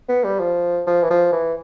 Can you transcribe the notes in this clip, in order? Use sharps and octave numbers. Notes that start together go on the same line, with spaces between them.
B3
G3
F3
F3
E3
F3
E3